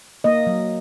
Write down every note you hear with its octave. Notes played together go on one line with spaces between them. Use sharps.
A#3 D#5
F#3